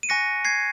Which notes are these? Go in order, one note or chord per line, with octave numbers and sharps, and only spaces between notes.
D#7
G#5 C#6 F#6 A#6 C#7
G#6 C7